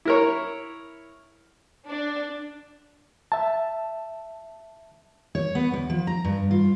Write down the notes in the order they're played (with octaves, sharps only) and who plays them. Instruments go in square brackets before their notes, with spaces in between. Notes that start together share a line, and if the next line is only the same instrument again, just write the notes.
[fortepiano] E4 A#4 C#5
[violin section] D4
[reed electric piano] E5 A5
[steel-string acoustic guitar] C#5
B3
D2
F3
A#5
G2
F4